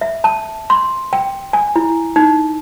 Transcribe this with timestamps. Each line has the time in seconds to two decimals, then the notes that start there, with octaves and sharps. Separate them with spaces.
0.01 E5
0.24 A5
0.70 C6
1.13 G5
1.53 G#5
1.76 E4
2.16 D#4